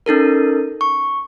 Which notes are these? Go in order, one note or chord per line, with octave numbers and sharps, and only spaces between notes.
C#4 D#4 A4 A#4
C#6